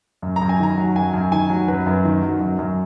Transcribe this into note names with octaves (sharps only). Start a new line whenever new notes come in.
F#2
A#5
F#2
G#5
D#3 A#5
F#3
F#2 G#5
F#2
D#3 G#5
F#3
F#2 B4
F#2
D#3
F#3
F#2
F#2